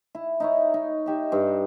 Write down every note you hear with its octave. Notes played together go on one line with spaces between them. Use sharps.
E4
D#4 E4 C#5
D#4
D#4 G4 E5
G2